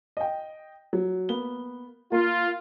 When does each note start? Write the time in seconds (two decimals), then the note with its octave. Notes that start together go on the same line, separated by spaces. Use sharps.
0.17 D#5 G5
0.93 F#3
1.29 A#3 B3 G7
2.12 A#3 F4